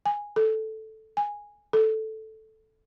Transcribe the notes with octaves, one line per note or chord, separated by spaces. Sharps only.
G#5
A4
G#5
A4